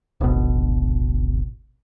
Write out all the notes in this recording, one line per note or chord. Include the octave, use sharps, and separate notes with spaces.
D1 G#1 B2